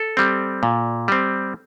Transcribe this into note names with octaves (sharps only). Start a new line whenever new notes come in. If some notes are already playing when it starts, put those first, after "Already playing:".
Already playing: A4
G3 C4
A#2
G3 C4